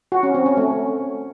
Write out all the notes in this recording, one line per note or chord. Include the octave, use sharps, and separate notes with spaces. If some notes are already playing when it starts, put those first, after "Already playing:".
F#4
C#4
C4
C#4
A3